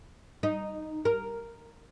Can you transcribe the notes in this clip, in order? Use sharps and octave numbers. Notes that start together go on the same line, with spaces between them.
D#4
A#4